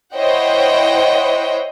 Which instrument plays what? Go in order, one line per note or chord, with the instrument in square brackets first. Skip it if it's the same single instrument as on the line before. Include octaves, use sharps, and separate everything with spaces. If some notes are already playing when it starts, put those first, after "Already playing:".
[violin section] E4 C5 C#5 D#5 F#5 G5